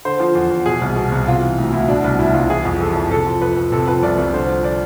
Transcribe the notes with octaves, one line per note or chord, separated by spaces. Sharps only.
D3 C5
F3
E2
E2
B2 G#4
C2
B2
C2
C3 F4
E3
D2
D2 E4
B2 D4
C2
B2 E4
C2 F4
E3 G#4
F2
E3 A4
F2
C3 A4
F3
F2 B4
F2
C3 A4
F3 B4
C2 D5
C2
D3 C5
F3
D5